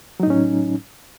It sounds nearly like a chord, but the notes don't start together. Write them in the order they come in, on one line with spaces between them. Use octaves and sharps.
F#3 D#4 A2 C#4